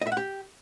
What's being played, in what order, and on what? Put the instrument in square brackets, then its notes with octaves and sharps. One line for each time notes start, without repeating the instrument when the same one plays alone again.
[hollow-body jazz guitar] D#5
E5
F#5
G4